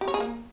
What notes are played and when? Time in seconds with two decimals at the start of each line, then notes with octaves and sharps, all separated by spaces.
0.01 G4
0.08 C#5
0.14 G#4
0.20 A#3